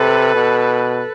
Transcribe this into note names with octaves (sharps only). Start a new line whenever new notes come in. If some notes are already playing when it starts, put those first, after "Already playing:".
Already playing: C3 A4 B4
B2